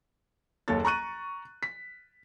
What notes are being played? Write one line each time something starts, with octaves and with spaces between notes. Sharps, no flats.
F#1 D#2 A4 C#5 A6
A#5 C#6 F#6 D#7
B6